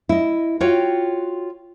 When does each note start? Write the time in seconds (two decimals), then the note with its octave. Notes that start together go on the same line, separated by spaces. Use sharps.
0.09 E4 D#5
0.61 F4 F#4 C#5 G5